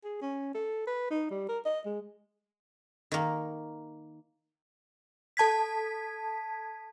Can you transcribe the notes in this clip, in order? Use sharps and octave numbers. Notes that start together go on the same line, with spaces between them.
G#4
C#4
A4
B4
D#4
G3
A#4
D#5
G#3
D#3 A#3
A4 A5 G#6 B6